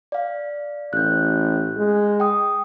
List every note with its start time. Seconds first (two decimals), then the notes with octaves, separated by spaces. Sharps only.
0.12 D5 F5
0.93 A1 F#6 G6
1.77 G#3
2.20 G5 D#6